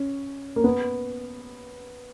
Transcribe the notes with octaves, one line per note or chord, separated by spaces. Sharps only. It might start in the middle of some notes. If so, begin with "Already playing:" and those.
Already playing: C#4
A#3
B3